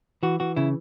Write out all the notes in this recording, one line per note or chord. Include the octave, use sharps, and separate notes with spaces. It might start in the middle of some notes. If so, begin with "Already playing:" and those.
E3 F#4
E3 F#4
C#3 E4